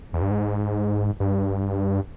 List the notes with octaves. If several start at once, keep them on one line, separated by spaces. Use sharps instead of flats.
E2
G2
G#2
G2